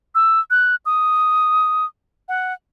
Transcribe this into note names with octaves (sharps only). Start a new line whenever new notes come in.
E6
F#6
D#6
F#5